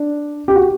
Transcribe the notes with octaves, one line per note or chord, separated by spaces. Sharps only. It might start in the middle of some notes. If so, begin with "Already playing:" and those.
Already playing: D4
G4
F#4